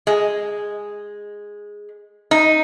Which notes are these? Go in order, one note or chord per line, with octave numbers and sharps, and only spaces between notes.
G#3
D#4